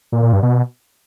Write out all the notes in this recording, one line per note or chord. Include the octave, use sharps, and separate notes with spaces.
A#2
A#2
G2
B2